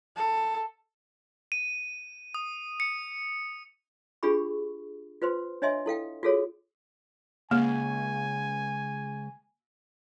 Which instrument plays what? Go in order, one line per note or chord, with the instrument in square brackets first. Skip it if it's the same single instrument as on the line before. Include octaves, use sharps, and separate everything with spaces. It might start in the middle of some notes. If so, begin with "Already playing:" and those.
[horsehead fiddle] A4
[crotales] D#7
D#6
C#7
[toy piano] D4 F4 G4 G#4 B5 C#6
F4 B4 C5 C6
D4 C#5 D#5 E5 G#5 C6
E4 A4 F5 G5
F4 F#4 G#4 A4 C#5
[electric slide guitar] C#3 G#3 G#4 [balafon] A#3 [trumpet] G#5